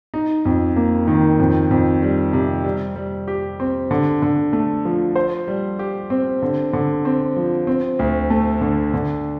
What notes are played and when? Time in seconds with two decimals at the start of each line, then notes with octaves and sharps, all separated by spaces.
0.14 D#4
0.45 F2
0.76 A#3
1.08 D#3
1.39 F2
1.71 F2
2.02 G3
2.33 C3
2.64 G3
2.96 G3
3.28 G4
3.60 C4
3.91 D3
4.22 D3
4.53 A3
4.85 F3
5.16 C5
5.48 G3
5.79 G4
6.10 C4
6.42 D3
6.73 D3
7.05 C4
7.36 F3
7.67 C4
7.99 D2
8.30 A3
8.61 D3
8.94 D3